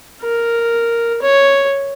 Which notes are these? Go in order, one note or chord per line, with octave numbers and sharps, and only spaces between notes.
A#4
C#5